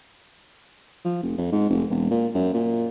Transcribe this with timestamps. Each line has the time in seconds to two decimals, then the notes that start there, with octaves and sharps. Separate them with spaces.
1.05 F3
1.23 F1
1.38 F2
1.52 G#2
1.70 F1
1.90 E1
2.10 A#2
2.34 F#2
2.54 A#2